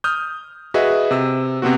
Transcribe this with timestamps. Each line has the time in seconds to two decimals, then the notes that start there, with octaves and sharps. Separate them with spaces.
0.04 D#6 F6 G6
0.74 F#4 G#4 B4 D#5 E5
1.11 C3 E6
1.62 C3 B3 C4 F#4